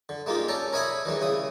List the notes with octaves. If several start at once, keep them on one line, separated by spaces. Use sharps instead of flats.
D3
G#3 A#3 D#4 F4 G4
C#4 A4 D5 A#5
A#4 C#5 D#5 E5 G#5 B5
D#3 E3 G3 G#3
C#3 E4 D#6